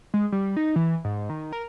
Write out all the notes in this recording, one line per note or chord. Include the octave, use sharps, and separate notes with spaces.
G#3
G3
D#4
E3
G#2
D#3
A#4